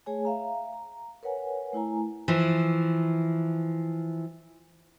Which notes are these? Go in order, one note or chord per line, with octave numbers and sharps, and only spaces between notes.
A3 G#4 C#5 G#5
E5 F5 A#5
A#5
A#4 B4 C#5 F#5 G#5
A3 E4 G#5 A#5
E3 F3